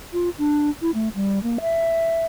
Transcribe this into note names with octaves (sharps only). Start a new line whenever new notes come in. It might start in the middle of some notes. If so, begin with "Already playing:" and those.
F4
D4
E4
A3
G3
A#3
E5